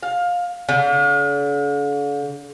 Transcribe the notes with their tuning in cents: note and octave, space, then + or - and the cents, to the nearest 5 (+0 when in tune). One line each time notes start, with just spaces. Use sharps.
F5 +20
D3 -45